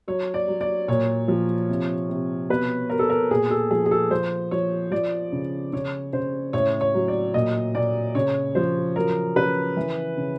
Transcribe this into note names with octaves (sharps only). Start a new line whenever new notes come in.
F#3 C#5
D5
F#3
D5
A#2 C#5
F3
C3
C3
B2 B4
B2 A#4
A4
A#4
A#2 G#4
A4
F3 G#4
G#4
A4
F3 C5
F3 C#5
F3 D5
C#3
C#3 C#5
C#3 C5
A2 C#5
C#5
F#3
D5
A#2 D#5
A#2 D5
C#3 C#5
F3 C5
F#3 A#4
C#3 B4
E3
C#3